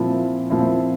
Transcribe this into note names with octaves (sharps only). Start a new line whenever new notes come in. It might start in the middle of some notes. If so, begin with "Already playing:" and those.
Already playing: A#2 F3 C4 E4
A#2 F3 C4 E4